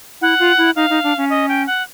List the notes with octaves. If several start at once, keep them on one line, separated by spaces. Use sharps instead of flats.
E4 F#5
F4
E4
D#4 F5
D#4
D4
C#4
D#5
G5
F#5